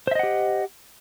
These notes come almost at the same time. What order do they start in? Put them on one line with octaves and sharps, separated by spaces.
C5 E5 D#5 F#5 G4